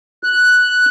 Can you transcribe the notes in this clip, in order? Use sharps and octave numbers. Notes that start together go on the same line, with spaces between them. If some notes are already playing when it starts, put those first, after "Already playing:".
F#6